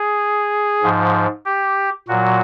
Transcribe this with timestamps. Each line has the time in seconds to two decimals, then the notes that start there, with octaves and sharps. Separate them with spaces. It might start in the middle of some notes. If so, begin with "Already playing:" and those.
Already playing: G#4
0.82 G#2 F3
1.45 G4
2.08 A#2 F#3 F#4